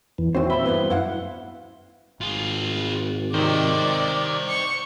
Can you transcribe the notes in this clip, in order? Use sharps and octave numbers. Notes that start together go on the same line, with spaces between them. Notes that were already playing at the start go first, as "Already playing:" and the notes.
E2 E3
D#3 E3 C4 F#4 C5 C#5
A#2 C5 E5 B5 G6
G2 B2 E3 B3
F#2 E4 F5 F#5
G#1 F4 G#4
C3 D#3 C5 D5 D#5
C#6